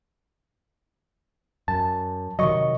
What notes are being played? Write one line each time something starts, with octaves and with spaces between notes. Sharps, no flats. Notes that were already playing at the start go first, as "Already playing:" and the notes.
F#2 A5
C3 D#3 F#3 D#5 C#6